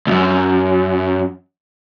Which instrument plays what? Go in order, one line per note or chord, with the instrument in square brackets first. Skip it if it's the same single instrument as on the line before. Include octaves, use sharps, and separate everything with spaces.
[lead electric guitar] C#2 F#2